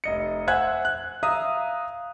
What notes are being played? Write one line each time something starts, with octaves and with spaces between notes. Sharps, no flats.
F1 D#5 C#7
C5 E5 F#5 G#5 F#6 G#6
F#6
E5 F5 A#5 D#6